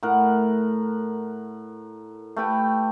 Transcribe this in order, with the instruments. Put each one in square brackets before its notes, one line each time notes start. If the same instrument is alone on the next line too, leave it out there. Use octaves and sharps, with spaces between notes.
[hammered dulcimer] A2 A#4 F#5
A3 G4 B4 G5